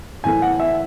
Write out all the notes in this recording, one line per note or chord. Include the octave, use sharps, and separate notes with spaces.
A2 E3 A3 G#5
F#5
E5